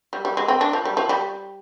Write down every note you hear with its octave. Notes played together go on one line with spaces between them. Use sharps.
G3
G3
G#3
C4
D4
F3
G3
F3
G3